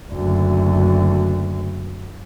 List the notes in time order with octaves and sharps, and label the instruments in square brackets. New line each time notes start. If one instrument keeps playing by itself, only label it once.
[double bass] F#1 D2